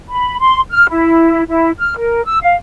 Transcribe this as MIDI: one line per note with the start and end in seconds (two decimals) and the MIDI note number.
0.10 0.37 83
0.39 0.61 84
0.70 0.88 89
0.90 1.42 64
1.49 1.71 64
1.79 1.95 89
1.98 2.24 70
2.25 2.38 88
2.43 2.54 77